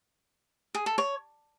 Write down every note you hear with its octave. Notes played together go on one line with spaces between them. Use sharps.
G#4
A4
C#5